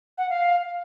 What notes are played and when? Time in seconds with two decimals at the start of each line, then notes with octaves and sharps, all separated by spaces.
0.18 F#5
0.30 F5